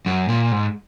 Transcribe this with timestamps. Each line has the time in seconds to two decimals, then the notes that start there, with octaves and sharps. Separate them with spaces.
0.06 F#2
0.29 A#2
0.52 G#2